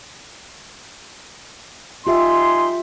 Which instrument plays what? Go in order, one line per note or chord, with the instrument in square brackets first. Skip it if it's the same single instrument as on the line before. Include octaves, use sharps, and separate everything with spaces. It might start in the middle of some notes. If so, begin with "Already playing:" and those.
[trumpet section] D#4 G#5 C6 [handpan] F4 G4 E5